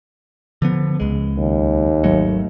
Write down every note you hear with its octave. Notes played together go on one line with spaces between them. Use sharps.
D3 F3 B3
C#2 G#3
D#2
G#1 F#3 A3